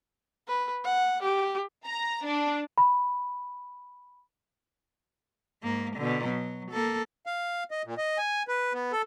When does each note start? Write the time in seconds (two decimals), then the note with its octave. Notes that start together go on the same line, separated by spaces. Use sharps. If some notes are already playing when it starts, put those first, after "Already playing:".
0.48 B4
0.84 F#5
1.22 G4
1.86 A#5
2.26 D4
2.78 B5
5.63 G#2 A#3
5.97 B2 D3
6.25 F#3
6.71 A#3 A4
7.26 F5
7.71 D#5
7.85 A#2
7.98 D#5
8.18 G#5
8.48 B4
8.73 B3
8.92 A4